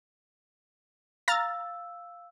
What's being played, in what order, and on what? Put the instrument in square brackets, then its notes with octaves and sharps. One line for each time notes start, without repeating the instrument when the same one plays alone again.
[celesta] F5 E6 [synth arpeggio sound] A#5 F6 A6